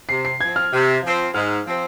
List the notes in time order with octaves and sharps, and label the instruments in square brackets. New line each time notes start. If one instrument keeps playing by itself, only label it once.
[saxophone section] C3 [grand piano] C7
[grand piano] C7
[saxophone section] F3 C4 [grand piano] G#6
[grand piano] F6
[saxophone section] C3
F3
C4
[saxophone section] G#2 [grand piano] F6
[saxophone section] F3 C4